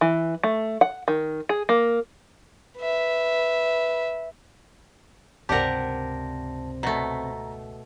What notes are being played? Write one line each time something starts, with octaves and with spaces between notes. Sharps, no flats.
E3
A3
F#5
D#3
G#4
A#3
B4 E5
C#2 G2 C3 G4 A#4 D5 F#5 A5
B2 A3 A#5